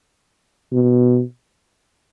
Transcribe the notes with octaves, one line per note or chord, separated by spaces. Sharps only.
B2